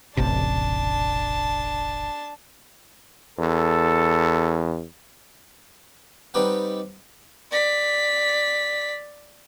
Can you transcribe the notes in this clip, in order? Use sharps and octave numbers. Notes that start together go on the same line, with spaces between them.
E1 A1 C3 D4 A5
E2 A4
G3 C4 D#4 G4 B4 F#5
D5 B6